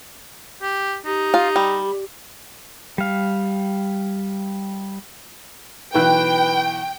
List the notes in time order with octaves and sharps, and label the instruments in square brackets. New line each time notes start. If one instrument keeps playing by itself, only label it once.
[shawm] G4
[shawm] D#4 [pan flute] G4
[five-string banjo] F4
G3
[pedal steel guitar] G3 F5
[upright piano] B1 E3 F#6 [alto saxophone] B4 [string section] G5